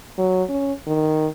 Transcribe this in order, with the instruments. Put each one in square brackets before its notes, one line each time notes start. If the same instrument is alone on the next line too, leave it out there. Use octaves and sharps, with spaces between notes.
[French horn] F#3
C#4
D#3